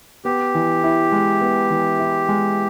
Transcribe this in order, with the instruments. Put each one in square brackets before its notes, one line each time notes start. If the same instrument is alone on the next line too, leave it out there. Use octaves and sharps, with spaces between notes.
[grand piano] B3 [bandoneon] G4
[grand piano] E3
E4
G#3
B3
E3
E4
G#3